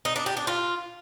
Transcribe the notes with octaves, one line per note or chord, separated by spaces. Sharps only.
D#4
D4
G4
D4
F4